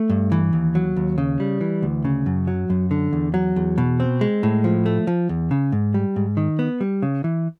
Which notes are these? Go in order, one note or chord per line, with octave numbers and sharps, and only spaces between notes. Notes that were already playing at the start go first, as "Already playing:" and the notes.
Already playing: A3
G2
E3
D#2
F#3
D#2
C#3
G3
E3
D2
C#3
F#2
F#3
F#2
D3
E2
F#3
E2
B2
C4
G#3
A2
F3
A3
F3
E2
C#3
G#2
G3
G#2
D#3
B3
G3
C#3
E3